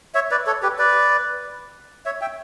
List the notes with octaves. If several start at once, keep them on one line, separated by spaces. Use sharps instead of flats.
C#5 E5
B4 D5
A4 C#5
G4 B4
B4 D5
C#5 E5
E5 G5